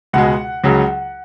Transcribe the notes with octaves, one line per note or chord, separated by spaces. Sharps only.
C#2 B2 G#3 F#5
C#2 C#3 F#3